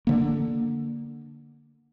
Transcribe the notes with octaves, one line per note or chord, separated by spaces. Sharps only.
D3 A#3